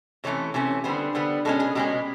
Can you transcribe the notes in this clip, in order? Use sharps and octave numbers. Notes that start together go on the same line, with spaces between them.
C3 E3 A3 C#4 C#5
C3 E3 A3 C#4
D3 G3 B3 C5
D3 G3 B3
B2 G#3 C#4 A4
G#4
B2 G#3 C#4 G4